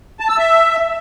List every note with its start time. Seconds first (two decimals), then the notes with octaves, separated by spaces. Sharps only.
0.20 A5
0.29 E6
0.38 E5